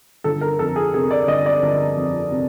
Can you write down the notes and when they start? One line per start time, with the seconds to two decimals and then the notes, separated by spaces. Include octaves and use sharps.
0.24 G1 A4
0.41 A#4
0.59 F2 A4
0.76 G#4
0.94 C3 G#4
1.11 D5
1.28 G1 D#5
1.46 D5
1.63 G1
1.97 F2
2.31 C3